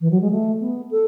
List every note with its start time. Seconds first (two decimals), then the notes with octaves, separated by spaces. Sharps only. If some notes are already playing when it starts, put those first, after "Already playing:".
0.01 E3
0.11 F#3
0.21 G#3
0.31 A3
0.60 B3
0.91 A4